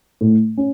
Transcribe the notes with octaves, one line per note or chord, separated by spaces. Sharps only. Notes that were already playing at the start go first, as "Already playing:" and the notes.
A2
C#4